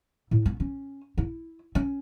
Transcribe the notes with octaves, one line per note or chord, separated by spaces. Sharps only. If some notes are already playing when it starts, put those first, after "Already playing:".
A2
B3
C#4
E4
C#4